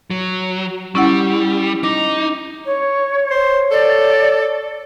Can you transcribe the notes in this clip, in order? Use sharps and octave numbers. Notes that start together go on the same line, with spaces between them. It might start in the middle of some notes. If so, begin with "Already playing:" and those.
F#3
G3 C#4 E4 F#5
D#4 D6
C#5
C5 C#5
A4 D5